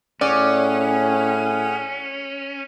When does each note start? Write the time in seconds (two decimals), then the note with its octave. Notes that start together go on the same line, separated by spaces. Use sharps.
0.21 A2 C#4 G#4 D5 F#5